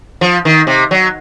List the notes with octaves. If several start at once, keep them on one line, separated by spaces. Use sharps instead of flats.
F3
D#3
C3
F#3